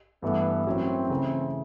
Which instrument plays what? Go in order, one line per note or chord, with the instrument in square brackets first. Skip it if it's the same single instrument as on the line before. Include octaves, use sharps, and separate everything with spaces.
[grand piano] G2 E3 A3 [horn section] B3
[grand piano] A2 F#3 A#3 C#4 E4 [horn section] C4
[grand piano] C#3 E3 A3